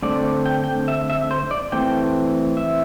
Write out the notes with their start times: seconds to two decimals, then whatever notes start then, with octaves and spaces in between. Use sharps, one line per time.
0.02 D3 A3 C4 D5
0.46 G5
0.64 G5
0.88 E5
1.10 E5
1.31 C5
1.51 D5
1.72 E3 A3 C4 G5
2.57 E5